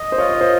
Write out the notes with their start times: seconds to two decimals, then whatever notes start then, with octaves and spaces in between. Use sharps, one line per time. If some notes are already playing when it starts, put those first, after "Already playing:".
Already playing: D#5
0.12 C5
0.18 F4 C#5
0.41 C5